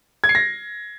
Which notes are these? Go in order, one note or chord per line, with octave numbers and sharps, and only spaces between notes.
G#6
C7
A#6